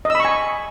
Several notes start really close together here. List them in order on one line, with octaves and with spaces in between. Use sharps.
D#5 E6 B5 C#6 G#5